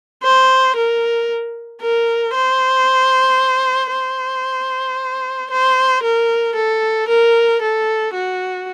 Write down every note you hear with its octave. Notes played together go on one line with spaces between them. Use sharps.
C5
A#4
A#4
C5
C5
C5
A#4
A4
A#4
A4
F#4